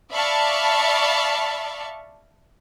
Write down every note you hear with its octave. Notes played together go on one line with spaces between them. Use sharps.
D5 E5 F5 A5 B5 C#6